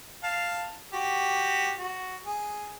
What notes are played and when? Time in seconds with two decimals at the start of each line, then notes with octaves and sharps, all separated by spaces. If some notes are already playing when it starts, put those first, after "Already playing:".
0.23 F5 A5
0.93 F#4 G4
1.77 F#4
2.26 G#4